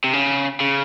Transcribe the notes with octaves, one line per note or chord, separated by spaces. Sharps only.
C3
C#3
C#3